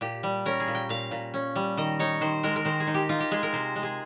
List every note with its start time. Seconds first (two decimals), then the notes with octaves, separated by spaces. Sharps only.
0.01 A#2 G4
0.23 G3
0.46 C#4 A#4
0.60 G#4
0.68 A#2
0.75 G5
0.89 A#2 F5
1.11 A#2
1.34 C#4
1.56 G3
1.77 D#3 D#5
1.99 D#4 C#5
2.21 D#3 C5
2.43 G#3 A#4
2.56 A#4
2.65 D#3 C5
2.80 G#4
2.87 D#4
2.94 G4
3.09 D#4 F4
3.20 G4
3.31 G#3 G#4
3.43 A#4
3.53 C3 C5
3.76 G#3
3.83 G#4